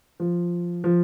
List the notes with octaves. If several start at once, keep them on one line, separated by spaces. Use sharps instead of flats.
F3
F3